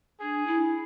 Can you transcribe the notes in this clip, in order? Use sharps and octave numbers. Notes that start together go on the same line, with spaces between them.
D4 G#4
E4